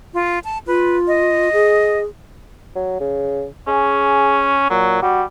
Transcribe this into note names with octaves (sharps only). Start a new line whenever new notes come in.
F4
A5
F4 B4
D#5
G#4
F#3
C#3
C#4 G#4
A#2 F#3
G3 F#4